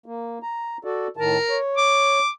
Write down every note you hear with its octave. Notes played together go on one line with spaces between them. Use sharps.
A#3
A#5
F#4 A4 D5
A2 D#3 A#4 A5
C#5
D6